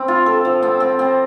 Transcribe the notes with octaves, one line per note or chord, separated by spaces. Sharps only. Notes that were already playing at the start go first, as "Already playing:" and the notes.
Already playing: C4
F4
A4
F3
C4
C4
C4